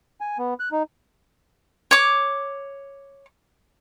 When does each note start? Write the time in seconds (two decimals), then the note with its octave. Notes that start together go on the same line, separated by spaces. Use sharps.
0.21 G#5
0.39 B3
0.60 F#6
0.72 D#4
1.91 C#5 D6